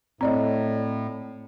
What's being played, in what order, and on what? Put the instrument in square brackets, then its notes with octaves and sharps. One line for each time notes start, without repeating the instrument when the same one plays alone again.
[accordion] A2 [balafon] C4 D5 D#5